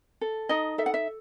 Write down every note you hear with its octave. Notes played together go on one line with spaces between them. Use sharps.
A4
D#4 D#5
A4 E5
F#5
E5